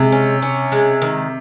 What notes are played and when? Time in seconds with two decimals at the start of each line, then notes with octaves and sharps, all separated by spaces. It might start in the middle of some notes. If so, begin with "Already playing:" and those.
Already playing: C3 G#3
0.12 C#4
0.42 C#4
0.72 G#3
1.02 D#3